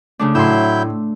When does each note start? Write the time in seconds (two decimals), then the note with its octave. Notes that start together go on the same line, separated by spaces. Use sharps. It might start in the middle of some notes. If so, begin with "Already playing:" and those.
0.19 C#3 A3 D4
0.35 A2 F#3 E4 C6 E6 G6